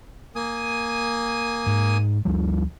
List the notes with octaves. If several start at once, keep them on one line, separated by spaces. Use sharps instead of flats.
A#3 G#5 D#6
G#2
D2 F3 G3